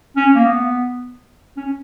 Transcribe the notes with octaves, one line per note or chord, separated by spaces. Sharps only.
C#4
A#3
B3
C#4